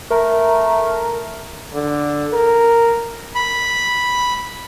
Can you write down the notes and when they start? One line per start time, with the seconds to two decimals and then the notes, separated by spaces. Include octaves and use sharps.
0.10 A3 A#4
1.74 D3
2.33 A#4
3.35 B5